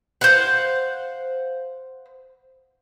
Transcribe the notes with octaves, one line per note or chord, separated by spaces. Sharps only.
C5 F5 F#5